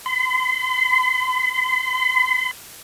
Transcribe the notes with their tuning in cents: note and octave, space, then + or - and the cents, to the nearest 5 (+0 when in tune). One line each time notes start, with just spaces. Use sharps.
C6 -45